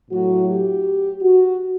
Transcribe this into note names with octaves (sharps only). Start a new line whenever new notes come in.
A2 F#3 A3 F#4
G4
F#4